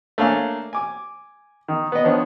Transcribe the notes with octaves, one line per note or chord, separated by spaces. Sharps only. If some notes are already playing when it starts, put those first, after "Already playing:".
A3 A#3 D4 C#5 F5 G#5
G#5 D6
D#3
B3 D#5
D#3 F3 B3 D4 C#5